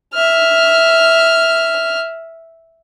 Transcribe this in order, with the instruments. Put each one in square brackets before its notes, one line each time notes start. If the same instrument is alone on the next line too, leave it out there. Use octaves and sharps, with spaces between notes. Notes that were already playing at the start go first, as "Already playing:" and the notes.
[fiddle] E5 F6